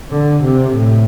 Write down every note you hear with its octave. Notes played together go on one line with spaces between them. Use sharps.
D3
C3
A2